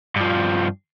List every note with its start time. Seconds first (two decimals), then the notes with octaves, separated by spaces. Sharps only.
0.16 G2 F3